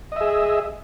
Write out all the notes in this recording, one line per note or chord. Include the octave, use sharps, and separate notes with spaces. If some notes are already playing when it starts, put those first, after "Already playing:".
G#4 D#5 E5